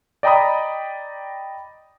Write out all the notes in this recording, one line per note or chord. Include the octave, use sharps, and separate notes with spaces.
D5 D#5 G5 A#5 B5 D#6